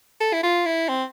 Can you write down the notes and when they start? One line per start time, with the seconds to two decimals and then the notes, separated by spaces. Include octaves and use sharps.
0.21 A4
0.33 E4
0.43 F4
0.66 E4
0.88 C4